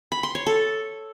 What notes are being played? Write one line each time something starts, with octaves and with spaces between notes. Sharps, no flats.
B5
C6
C#5
A4